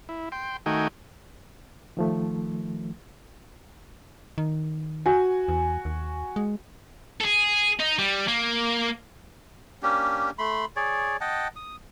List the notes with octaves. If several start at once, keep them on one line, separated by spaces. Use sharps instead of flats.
E4
G5 C6
D#3 A3 D#4 F#4 G5 G#5
D#3 F3 A3
D#3
F#4 G#5
E2
D#2
G#3
G#4 A4
D#4
G3
A#3
A#3 C#4 D4 G4
A3 B5 C6
G#4 C#5 D5
D#5 F#5 G5 A5
D#6